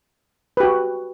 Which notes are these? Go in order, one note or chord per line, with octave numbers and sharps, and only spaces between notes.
F#4 G4 B4